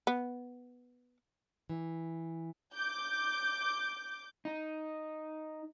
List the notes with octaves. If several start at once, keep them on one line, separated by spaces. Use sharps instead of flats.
B3
E3
D6 G6
D#4